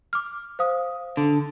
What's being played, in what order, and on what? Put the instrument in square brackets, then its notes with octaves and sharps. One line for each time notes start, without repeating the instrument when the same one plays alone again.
[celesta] D6 F6
C5 F5 D#6
[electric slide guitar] D3